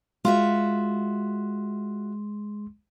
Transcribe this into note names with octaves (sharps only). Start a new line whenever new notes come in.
G#3 F4 F#4 E5 C6